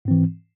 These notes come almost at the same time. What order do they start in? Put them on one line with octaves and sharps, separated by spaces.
G#2 C4 E3